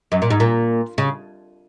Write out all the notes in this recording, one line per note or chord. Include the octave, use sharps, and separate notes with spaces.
F#2
A#2
G#2
A#2
C#3